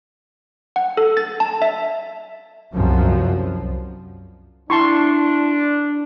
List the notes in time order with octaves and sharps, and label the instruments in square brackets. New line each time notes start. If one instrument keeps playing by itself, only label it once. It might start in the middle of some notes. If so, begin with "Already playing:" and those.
[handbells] F#5
A4
A6
A5
E5
[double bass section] C2 F#2 F3
[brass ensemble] D4 [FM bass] E4 [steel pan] A5 C6 C#6